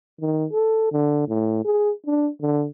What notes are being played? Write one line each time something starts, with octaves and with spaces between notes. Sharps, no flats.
D#3
A4
D3
A2
G#4
D4
D3